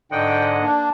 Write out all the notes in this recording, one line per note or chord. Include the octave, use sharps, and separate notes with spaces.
G#2 D3 D#5 F#5 G5
A#3 D4